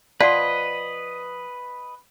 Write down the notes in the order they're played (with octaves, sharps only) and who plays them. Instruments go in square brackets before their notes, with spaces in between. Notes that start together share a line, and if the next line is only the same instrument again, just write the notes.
[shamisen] F3 [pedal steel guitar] B4 D#5 [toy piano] D5 F#5 [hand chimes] B6